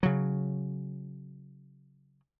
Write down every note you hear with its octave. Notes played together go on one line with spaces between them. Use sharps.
C#3 F#3